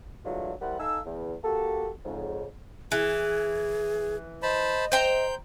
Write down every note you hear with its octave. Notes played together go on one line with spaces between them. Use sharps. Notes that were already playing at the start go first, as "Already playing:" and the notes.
E3 F#3 G#3 A3 D4 F4
G3 E4 A#4 C5 F#5
D#4 A4 F5 G#5 E6
E2
A#3 F#4 G4 A4
F2 G#2 C#3
E3 G#4
C5 D#5 A5 B5
C5 G5 A#5 G6